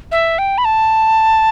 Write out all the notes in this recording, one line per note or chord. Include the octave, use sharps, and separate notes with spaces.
E5
G5
B5
A5